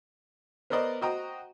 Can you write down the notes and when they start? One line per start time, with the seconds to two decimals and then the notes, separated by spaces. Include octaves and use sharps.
0.70 B3 A#4 C5 D5 D#5
1.01 F#4 C5 D#5 G5 A#5 D#6